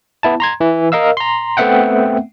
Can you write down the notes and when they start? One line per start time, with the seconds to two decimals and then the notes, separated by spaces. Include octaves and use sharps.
0.23 B3 E4 A5
0.40 A#5 C6 G#6
0.61 E3
0.92 A#4 D#5 F5 E6
1.17 A#5 C6
1.57 A3 B3 C4 E5 F#5 G5